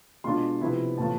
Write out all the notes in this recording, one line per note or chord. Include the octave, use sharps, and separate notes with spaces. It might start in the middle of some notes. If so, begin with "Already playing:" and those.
B2 G#3 D4 F4 C6
C3 F3 B3 E4 B5
A2 E3 B3 F4 A5